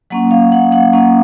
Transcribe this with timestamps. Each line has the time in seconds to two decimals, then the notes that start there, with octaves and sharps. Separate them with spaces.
0.10 F#3 A#3 C#4 F#5
0.31 F5
0.52 F#5
0.72 F#5
0.93 F#3 A#3 C#4